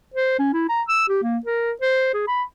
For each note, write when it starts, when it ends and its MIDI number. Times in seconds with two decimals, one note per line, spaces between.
0.14 0.39 72
0.39 0.53 61
0.53 0.64 64
0.69 0.82 82
0.89 1.04 88
1.09 1.19 67
1.23 1.38 58
1.46 1.72 70
1.82 2.11 72
2.14 2.25 68
2.27 2.43 83